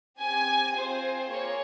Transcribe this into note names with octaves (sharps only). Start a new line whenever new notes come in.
C4 G4 G#5
C4 F4 G#4 C5
A#3 F4 G#4 C#5